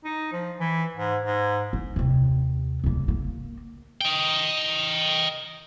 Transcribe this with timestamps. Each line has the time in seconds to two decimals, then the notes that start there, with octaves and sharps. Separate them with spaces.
0.04 D#4
0.32 F3
0.60 E3
0.96 G#2
1.25 G#2
1.73 D#4
1.96 D#2 C3
2.84 C#3 A#3
3.08 A#3
4.01 D#5 G5